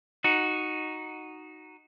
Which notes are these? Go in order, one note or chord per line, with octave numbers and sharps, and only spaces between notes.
D#4 F#4